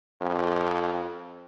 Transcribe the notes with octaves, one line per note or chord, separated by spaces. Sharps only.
F2